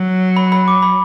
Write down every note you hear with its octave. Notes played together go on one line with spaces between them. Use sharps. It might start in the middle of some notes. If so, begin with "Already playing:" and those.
Already playing: F#3
B5
B5
D6
B5